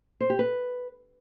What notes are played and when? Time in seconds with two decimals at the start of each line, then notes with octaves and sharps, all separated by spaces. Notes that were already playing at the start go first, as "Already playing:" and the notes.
0.20 C5
0.30 G4
0.39 B4